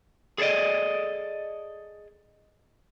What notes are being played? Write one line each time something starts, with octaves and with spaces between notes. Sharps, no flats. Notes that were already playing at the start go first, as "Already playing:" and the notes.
G#4 A4 C5 D5 D#5